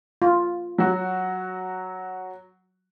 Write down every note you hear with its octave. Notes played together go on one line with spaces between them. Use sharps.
F4
F#3 F#4